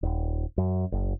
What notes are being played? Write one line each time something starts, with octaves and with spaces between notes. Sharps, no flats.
D#1
F#2
F#1